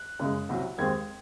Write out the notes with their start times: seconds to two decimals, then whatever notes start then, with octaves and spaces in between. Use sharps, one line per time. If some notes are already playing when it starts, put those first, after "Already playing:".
Already playing: F#6
0.20 F#2 C#3 G#3
0.49 C2 C3 F#3
0.78 D#2 D#3 G#3 C4 G#6